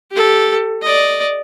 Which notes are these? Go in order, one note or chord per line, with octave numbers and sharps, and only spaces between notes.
G4 A4
D5 D#5